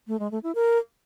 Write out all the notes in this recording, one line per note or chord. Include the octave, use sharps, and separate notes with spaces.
A3
G#3
A3
E4
A#4